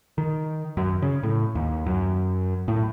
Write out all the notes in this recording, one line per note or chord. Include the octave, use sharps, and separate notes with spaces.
D#3
F#2
C#3
A2
D#2
F#2
A2